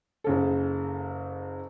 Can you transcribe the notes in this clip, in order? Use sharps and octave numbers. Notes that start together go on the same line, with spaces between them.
F#1 C#3 A4